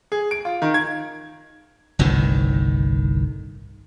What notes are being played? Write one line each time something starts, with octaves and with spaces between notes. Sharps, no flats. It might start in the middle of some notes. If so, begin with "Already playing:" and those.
G#4
D7
F4
D#3
G#6
G1 C2 A2 D#3